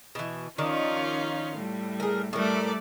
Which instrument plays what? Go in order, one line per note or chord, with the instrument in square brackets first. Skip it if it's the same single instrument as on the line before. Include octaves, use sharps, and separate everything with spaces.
[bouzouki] B2 E3
[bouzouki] D#3 F3 D5 [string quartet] C#4 D#4 F4
[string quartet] A2 G3
[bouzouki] G#4 A#4
[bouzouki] A2 A#4 [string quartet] G3 A3 D5